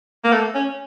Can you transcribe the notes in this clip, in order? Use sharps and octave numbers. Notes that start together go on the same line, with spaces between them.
A#3
A3
C#4